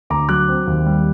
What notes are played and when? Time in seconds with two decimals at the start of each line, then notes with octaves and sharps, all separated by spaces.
0.10 D2 A#5 D6
0.29 F#3 D6 F#6
0.48 C4
0.67 D#2
0.86 G3